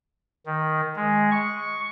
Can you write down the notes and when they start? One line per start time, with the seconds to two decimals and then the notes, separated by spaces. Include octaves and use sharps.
0.46 D#3
0.96 G#3
1.31 C#6